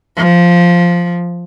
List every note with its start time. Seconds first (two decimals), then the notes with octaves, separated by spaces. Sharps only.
0.16 F3